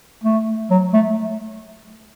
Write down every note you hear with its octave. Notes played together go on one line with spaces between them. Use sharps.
A3
F#3
A3